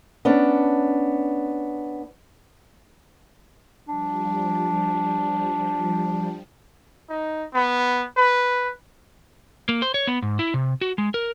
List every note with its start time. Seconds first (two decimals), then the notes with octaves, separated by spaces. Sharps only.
0.25 B3 C#4 D4
3.88 F3 G3 D4
7.10 D#4
7.54 B3
8.17 B4
9.69 A#3
9.82 C5
9.94 C#5
10.07 B3
10.22 G#2
10.39 E4
10.54 C3
10.81 F#4
10.98 G#3
11.14 A#4